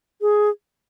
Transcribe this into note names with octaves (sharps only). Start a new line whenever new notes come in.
G#4